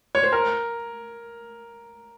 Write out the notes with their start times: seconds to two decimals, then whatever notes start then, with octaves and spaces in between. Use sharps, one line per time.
0.15 C#5
0.23 C5
0.32 A#4